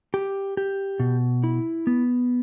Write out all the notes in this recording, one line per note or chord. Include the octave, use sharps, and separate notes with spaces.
G4
G4
B2
E4
B3